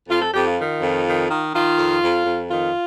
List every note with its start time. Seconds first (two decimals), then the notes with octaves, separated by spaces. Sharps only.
0.09 F2 F4
0.21 A4
0.33 F2 G4
0.46 F4
0.58 D#3
0.81 F2
1.06 D#3
1.29 D#3
1.54 D#3 F4
1.77 F2
2.01 F2
2.26 F2
2.50 D#3 F4